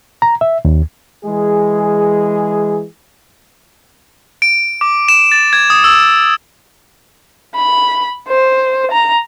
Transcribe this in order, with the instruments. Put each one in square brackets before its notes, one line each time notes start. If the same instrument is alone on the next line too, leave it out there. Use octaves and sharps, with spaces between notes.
[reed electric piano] A#5
E5
D#2
[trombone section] E3 G#3 G#4
[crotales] D7
D6
E7
A6
G#6
D#6
E6
[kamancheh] B5
C5
A#5